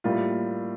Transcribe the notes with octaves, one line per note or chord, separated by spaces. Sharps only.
A2 G3 A#3 F4